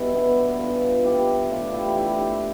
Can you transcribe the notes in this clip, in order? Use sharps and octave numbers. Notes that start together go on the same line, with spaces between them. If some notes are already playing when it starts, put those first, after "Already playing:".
Already playing: B2 G3 E4
B3 D4
B3
B2 G3 F4 A4
E4 G4
A2 E3 G3 D4 F4
E4 G4
E4 G4
E4 G4